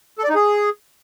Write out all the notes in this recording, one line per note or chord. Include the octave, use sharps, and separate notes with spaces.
A4
D5
D#4
G#4